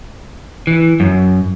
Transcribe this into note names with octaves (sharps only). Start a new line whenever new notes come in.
E3
F#2